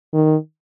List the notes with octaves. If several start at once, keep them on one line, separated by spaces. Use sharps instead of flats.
D#3